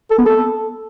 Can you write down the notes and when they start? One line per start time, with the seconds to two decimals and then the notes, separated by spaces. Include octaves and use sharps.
0.11 A4
0.19 B3
0.26 A4